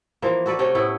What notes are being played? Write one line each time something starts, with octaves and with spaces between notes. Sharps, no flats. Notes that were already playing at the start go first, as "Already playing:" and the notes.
E3 F3 A#3
F#4 A4 B4 D5
C3 A3 C#4 G5
A2 B3 E4